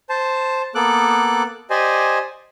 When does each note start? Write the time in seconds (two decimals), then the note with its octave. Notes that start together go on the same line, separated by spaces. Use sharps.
0.09 C5 A5
0.75 A#3 B3 A4 D6 F#6
1.70 G4 C5 D5 D#5 G#5